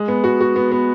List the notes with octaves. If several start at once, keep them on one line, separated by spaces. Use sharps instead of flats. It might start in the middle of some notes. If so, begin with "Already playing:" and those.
Already playing: G#3
B3
F#4
F#4
B3
B3